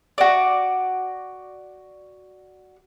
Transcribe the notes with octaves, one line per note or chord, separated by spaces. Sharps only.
F#4 D5